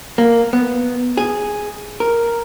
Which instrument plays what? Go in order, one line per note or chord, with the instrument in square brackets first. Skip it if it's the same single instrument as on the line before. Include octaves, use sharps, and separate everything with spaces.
[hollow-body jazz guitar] A#3
B3
G#4
A#4